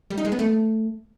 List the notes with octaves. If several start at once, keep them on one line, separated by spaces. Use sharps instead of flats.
G3
D#4
G#3
B3
A3